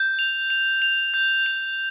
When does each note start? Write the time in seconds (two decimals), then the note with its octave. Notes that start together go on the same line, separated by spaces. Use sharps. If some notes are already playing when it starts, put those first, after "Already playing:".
Already playing: G6
0.19 F7
0.50 F7
0.82 F7
1.14 G6
1.46 F7